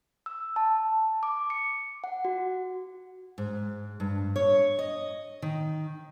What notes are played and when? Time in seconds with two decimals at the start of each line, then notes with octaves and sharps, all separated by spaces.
0.26 E6
0.56 A5
1.23 D6
1.50 C#7
2.04 F#5
2.25 F#4
3.38 G#2
4.00 G2
4.36 C#5
4.79 D#5
5.42 D#3